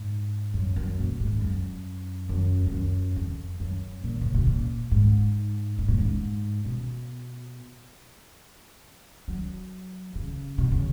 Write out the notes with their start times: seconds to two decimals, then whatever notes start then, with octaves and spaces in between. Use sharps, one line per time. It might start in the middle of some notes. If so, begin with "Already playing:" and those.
Already playing: G#2
0.54 F#2
0.76 F#2
0.98 A#2
1.20 G#2
1.41 F#2
2.29 F#2
2.66 F2
2.73 F#2
3.16 F2
3.60 F#2
4.04 A#2
4.21 C#3
4.34 B2
4.47 A#2
4.91 G#2
5.79 G#2
5.88 A#2
5.98 G#2
6.65 B2
9.28 F#3
10.15 C#3
10.58 B2
10.71 C#3